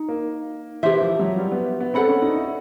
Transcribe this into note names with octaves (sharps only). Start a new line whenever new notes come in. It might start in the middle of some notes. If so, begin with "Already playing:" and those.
Already playing: D#4
A#3
E3 E4 G4 C5 E5
F3
F#3
G3
B3
B3
C4 A4 D5 F#5 B5
C#4
D#4
E4